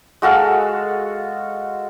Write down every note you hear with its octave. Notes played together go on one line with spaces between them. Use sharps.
G#3 F#4 A4 F5